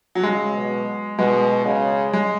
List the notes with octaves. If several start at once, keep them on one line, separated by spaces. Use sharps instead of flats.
F#3
C#3 G#3
B2
B2 G#3
C#3
G#3